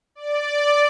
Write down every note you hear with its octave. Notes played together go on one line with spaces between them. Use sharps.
D5